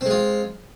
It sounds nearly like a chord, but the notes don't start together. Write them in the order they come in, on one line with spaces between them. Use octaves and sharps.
C4 G#3 F4